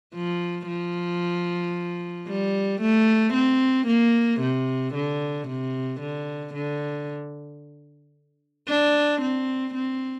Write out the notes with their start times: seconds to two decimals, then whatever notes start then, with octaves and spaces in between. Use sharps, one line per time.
0.14 F3
0.67 F3
2.28 G3
2.81 A3
3.34 C4
3.87 A#3
4.40 C3
4.95 D3
5.48 C3
6.01 D3
6.54 D3
8.68 D4
9.22 C4
9.74 C4